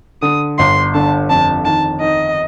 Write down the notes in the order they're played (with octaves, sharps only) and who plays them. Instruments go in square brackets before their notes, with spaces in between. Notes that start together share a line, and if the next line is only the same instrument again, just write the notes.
[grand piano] D3 [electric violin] D#6
[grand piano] G1 [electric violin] C6
[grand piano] D3 [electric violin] A5
[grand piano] F2 [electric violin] A5
[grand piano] D#3 [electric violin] A5
[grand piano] D#3 [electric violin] D#5